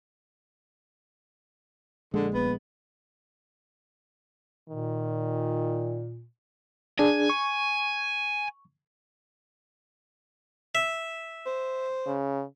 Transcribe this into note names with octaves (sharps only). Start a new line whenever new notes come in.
A#1 D3 G#3
D#1 B3
A#2 D#3
D4 G#4 G#5
C#6
E5
C5
C#3